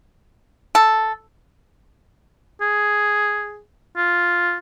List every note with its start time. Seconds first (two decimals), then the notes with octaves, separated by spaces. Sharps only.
0.75 A4
2.61 G#4
3.97 F4